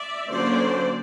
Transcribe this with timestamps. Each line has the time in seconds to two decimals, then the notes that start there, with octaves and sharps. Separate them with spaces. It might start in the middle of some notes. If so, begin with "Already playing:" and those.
Already playing: D5 E5
0.30 D3 F#3 A#3 C#4 C5 D5